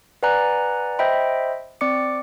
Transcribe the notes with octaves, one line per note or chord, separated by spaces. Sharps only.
B4 D5 F#5 G#5 A#5 F#6
C5 D#5 E5 G5 B5
C4 D5 D6 C#7